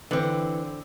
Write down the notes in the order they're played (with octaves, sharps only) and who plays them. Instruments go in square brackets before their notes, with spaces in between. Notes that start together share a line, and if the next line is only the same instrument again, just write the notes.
[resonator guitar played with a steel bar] D3 C4 [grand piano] E3 B4 F#7